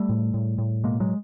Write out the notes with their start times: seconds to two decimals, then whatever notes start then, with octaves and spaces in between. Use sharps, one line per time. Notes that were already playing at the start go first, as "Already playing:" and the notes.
Already playing: G3 A3
0.09 A2
0.34 A2
0.58 A2
0.84 B2 G#3 A#3
1.00 F#3 G#3